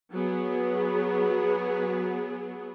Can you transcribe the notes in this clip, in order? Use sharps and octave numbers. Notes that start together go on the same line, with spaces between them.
F#3 B3 G#4